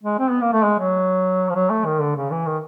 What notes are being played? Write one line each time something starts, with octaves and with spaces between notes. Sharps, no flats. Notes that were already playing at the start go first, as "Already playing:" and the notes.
G#3
C4
B3
A#3
A3
G#3
F#3
F3
F#3
A3
D#3
D3
C#3
E3
D#3